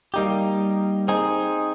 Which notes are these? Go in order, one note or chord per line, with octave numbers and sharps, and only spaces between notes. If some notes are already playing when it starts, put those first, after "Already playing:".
G3 A#3 D#4 G4
C4 D#4 G#4